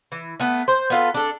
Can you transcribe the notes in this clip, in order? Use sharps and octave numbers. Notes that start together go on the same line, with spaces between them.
E3
A3 B3
C5
B3 F4 A4
D4 A4